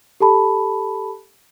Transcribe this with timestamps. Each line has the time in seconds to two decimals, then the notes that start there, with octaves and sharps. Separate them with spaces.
0.20 G4 A4 A5 B5